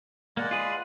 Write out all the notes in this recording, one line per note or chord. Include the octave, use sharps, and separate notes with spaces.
G#3 A#3 D5 F#5
F4 G#4 B4